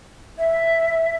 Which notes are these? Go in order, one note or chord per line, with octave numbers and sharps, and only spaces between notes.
E5